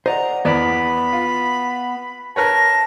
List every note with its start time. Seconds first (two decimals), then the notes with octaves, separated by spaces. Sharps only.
0.06 C5 D5 D#5 F#5 A#5
0.45 E2 B3 D5 B5
1.13 F4
2.36 A#4 B4 C#5 A5 A#6